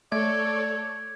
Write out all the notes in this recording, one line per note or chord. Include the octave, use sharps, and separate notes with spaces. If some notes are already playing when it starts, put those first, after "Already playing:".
A3 A4 C#5 D5 G#6